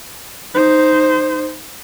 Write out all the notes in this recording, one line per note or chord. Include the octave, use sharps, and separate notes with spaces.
D#4 C5